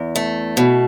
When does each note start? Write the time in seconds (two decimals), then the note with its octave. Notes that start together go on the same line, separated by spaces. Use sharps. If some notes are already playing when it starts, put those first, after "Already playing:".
Already playing: E2
0.16 A3
0.57 B2